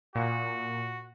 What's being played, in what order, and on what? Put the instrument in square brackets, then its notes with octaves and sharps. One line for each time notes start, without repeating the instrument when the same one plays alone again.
[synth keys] A#2 [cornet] F#4